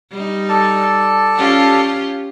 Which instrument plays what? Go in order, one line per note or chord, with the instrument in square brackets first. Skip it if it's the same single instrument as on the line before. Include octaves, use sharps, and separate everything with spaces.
[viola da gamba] G3 D#4
[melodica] A4 D5 A5
[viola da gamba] C#4 F4 G4